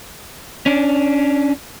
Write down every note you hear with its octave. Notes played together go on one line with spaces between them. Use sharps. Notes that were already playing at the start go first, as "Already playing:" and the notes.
C#4 D4